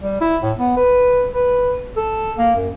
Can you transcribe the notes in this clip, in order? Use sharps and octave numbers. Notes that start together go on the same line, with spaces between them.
G3
E4
A2
B3
B4
B4
A4
A#3
F#2